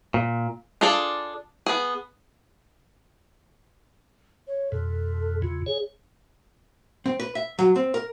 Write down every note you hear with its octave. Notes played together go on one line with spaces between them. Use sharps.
A#2
D4 F4 G#4 A4 D5
B3 G#4
C#5
F2 B2 A4
E2 C#3 F4
G#4 C#5
C4
B4
E5
F#3
C4
A#4